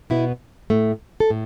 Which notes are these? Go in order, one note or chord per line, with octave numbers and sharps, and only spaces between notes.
B2 B3 E4
A2 A3
A4
A2